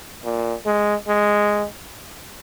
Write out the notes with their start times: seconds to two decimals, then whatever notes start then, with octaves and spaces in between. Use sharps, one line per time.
0.25 A#2
0.66 G#3
1.08 G#3